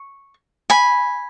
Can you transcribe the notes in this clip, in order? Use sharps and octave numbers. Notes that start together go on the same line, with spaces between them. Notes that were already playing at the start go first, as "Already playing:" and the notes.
Already playing: C#6
G#5 B5